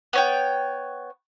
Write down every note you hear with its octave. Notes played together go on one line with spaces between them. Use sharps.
B3 C#5 G5